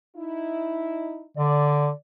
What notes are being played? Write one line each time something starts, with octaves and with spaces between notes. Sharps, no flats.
D#4 E4
D3 D5